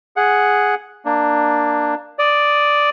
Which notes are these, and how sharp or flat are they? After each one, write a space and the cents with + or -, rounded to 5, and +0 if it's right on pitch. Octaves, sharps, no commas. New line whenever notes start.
G#4 +0 F#5 +0
A#3 +0 D4 +10
D5 +0 D#6 +0